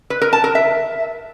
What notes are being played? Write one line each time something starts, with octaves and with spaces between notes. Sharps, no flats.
B4
A#4
A5
A#4
E5